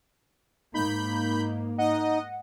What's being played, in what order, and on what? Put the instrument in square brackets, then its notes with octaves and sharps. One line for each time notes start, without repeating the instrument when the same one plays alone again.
[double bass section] G#2 A#3 [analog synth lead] D#4 [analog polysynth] B5 G6
[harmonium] D#4 [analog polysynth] D#5 [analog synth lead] F#5